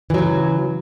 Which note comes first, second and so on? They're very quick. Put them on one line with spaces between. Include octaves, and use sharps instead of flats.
E3 F#3 C#3